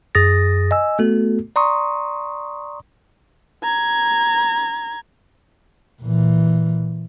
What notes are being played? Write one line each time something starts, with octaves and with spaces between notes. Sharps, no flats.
F#2 G#4 D#6 A6 A#6
D#5 G#5 E6
A3 B3 F#4 A4
D5 A#5 C6 C#6 D#6
A#5 G#6
A#2 E3